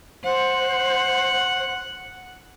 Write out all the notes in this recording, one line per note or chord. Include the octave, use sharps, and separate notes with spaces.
C5 F#5